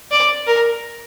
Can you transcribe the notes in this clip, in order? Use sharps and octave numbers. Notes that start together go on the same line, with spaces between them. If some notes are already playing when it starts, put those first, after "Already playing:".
D5
A#4